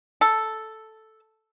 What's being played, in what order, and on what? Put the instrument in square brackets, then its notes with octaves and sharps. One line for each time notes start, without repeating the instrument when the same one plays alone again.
[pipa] A4